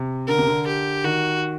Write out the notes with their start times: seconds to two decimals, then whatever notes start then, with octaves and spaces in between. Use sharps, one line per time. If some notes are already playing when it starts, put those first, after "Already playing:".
Already playing: C3
0.28 D3 A#4
0.38 C3
0.47 D3
0.67 G4
1.04 D#3 F#4